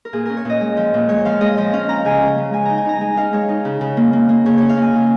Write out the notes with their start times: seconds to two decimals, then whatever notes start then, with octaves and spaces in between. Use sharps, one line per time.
0.05 A#4
0.13 A#2 G#4
0.26 C#4 A#4
0.37 C#5
0.45 A#2 D#5
0.61 G#3
0.77 F3
0.94 A#2
1.09 G#3 C#5
1.25 F3 F5
1.41 G#3 D#5
1.57 F3 D#5
1.73 C#4 F5
1.89 C#4 A#5
2.05 C#3 G#5
2.22 C#3
2.38 G#3
2.53 G#3 G#5
2.66 D#4 A#5
2.77 G#5
2.85 D#4 A#5
3.01 G#3 G#5
3.17 D#4 F5
3.33 G#3 C#5
3.49 D#4
3.65 C#3
3.81 C#3
3.97 A#3
4.13 A#3
4.29 A#3
4.46 C#3 C#5
4.58 C#4 C#5
4.69 F5
4.77 A#3 G#5
4.94 C#3